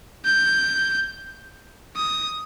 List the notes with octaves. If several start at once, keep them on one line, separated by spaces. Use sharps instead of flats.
G6
D#6